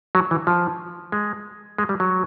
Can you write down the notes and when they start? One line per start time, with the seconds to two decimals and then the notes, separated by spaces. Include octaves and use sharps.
0.15 F#3
0.31 E3
0.47 F3
1.12 G#3
1.78 G#3
1.89 G3
2.00 F#3